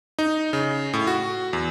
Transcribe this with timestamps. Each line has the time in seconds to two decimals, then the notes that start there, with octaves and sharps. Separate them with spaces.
0.19 D#4
0.53 C#3
0.93 A2
1.07 F#4
1.53 E2